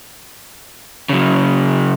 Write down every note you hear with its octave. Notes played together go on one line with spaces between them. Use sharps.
C#3 F#3